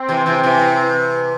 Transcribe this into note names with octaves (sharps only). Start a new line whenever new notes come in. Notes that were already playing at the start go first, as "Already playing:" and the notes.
Already playing: C4
C3 E3
C3 E3
C3 E3